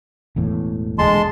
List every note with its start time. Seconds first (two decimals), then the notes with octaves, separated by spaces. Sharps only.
0.36 E1 E2 A2
0.98 E1 A#1 D3 G#3 A5 C6